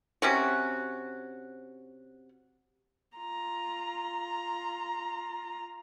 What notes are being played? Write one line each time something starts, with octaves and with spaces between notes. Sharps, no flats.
C3 C#4 F#4
F4 A#5